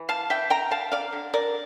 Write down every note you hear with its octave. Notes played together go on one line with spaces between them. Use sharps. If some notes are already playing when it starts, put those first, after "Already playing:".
Already playing: E3
F5 A5
E3 E5 G5
G5 A#5
D3 F5 A5
D5 F5
D3
A#4 D5